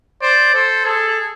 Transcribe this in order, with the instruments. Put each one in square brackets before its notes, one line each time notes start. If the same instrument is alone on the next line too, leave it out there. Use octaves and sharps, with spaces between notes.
[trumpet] C5 [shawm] D5
[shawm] A4 [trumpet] C5
[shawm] G#4 [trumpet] A4
[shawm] G#4